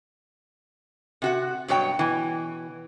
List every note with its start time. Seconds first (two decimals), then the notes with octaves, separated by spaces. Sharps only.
1.22 C3 F#4 F#5
1.68 G2 B2 F#3 C#5 G5
1.99 B2 E3